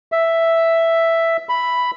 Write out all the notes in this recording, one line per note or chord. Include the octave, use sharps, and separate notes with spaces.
E5
B5